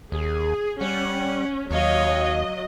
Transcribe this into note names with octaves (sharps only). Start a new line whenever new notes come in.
D#2 G#4
G3 C#4 F#5
D#2 F#3 C#5 D#5 F5